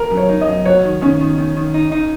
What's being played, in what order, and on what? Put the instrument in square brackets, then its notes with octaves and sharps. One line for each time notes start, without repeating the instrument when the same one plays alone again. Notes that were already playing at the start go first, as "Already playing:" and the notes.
Already playing: [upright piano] A#4
[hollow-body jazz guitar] F#2
[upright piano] C#5
[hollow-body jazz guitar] D#4
[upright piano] D#5
[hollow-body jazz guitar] F#2
[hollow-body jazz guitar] F#3 [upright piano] C#5
[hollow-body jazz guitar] D#3
[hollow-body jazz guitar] D#3 [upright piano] C#4
[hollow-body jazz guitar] D#3
D#3
D#3
D#4
D#4